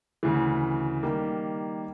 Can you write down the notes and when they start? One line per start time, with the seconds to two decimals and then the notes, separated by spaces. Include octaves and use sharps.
0.23 D2 C#3 E3
1.03 D#3 G3 A#3